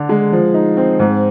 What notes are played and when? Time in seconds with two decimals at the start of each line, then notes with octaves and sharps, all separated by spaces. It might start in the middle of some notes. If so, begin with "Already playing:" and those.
Already playing: D3 D4
0.09 G#3
0.32 F3
0.54 D#4
0.77 C4
0.99 G#2